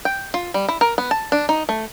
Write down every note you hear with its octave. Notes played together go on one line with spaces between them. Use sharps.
G5
F4
G3
E4
A#4
B3
A5
D4
D#4
A3